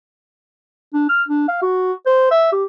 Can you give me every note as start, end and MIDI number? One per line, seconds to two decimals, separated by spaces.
0.93 1.08 62
1.09 1.23 89
1.28 1.47 62
1.48 1.58 77
1.62 1.93 66
2.07 2.30 72
2.31 2.47 76
2.52 2.64 67